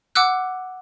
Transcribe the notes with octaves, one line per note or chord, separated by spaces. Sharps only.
F#5 D6 E6 F#6